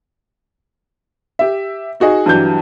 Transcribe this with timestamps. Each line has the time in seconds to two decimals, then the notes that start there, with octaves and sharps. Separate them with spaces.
1.39 G4 E5
2.00 D#4 F#4 G#4 D#5
2.26 G2 E3 F#3 G4 G6